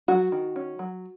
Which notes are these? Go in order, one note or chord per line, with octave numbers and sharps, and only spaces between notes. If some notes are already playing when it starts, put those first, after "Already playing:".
F#3 F#4
D#3
C#4
F#3